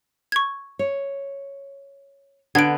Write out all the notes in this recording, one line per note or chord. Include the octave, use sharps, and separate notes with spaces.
C#6 G#6
C#5
D3 B3 G#6 D7